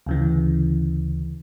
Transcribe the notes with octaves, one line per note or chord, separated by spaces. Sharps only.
D2 C#3 E3